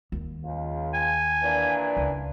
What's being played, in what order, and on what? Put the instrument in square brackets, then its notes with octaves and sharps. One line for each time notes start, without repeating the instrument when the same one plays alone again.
[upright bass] D#2
[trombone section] C#2 F4
[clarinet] G#5
[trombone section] A#2 E3 D4
[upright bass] C#2